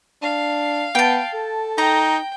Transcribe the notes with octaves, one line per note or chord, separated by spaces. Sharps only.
D4 F5
B3 G5 A5
A4
D#4 G5 A#5